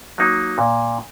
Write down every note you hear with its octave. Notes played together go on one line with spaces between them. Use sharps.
F#3 A#3 D#4
A#2